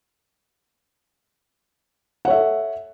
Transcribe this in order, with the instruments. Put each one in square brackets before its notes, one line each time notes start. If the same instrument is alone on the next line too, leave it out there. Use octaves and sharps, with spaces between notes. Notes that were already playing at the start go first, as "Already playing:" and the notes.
[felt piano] F#5
C#5
E5
A4